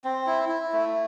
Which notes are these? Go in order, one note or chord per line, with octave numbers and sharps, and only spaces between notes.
C4
E4
E4
A3